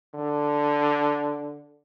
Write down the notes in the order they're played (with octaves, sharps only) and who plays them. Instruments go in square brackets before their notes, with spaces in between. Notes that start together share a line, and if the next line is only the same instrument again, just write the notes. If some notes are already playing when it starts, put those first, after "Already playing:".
[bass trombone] D3